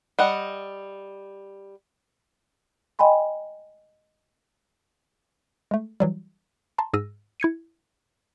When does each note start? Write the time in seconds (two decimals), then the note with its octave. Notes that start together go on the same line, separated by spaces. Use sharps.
0.19 G3 D#5 F#5
2.99 D#5 G5 G#5 B5 C6
5.71 G#3 A3
6.00 E3 F#3 G3
6.78 A5 A#5 C6
6.93 G#2 G#4 E6 F6 A#6 D#7
7.40 E4 G#6 C#7 D#7